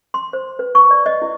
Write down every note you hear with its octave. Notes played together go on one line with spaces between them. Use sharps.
C6
C5
B4
C#6
D5
D#5
E4